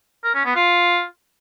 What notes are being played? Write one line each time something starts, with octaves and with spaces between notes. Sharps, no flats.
A#4
C#4
B3
F4